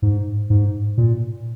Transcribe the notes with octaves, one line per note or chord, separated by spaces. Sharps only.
G#2
G#2
A#2